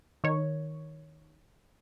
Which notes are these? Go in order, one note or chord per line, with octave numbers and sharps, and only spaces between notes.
D#3 C#5